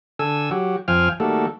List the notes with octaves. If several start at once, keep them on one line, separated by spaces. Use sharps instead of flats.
D3 A4 G#5 E6
F#3 F#4 G4
F2 F3 F5 G5 G#5 F6
D#3 G3 A3 A#3 F#4 A4